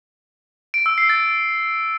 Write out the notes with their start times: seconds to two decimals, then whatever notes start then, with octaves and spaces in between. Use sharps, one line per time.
0.74 D7
0.86 E6
0.98 C7
1.10 A6